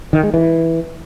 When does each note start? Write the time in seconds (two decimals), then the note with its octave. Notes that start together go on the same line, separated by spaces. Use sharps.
0.13 D#3
0.23 G#3
0.34 E3